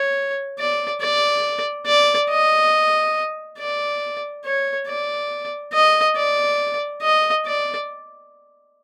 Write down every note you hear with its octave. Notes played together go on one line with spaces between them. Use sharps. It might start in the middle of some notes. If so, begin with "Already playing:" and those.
Already playing: C#5
D5
D5
D5
D#5
D5
C#5
D5
D#5
D5
D#5
D5